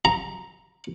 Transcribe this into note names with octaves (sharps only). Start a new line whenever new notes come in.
A#5